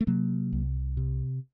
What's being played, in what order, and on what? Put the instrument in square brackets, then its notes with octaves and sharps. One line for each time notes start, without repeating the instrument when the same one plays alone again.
[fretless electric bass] A3
C3 F#3 A#3
C2
C3